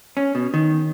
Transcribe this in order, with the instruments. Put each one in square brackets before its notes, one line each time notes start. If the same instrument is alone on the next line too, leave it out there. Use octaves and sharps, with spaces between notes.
[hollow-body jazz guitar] C#4
B2
D#3